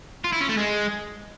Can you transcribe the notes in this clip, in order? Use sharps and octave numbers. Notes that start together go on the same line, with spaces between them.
F4
E4
C#4
A3
G#3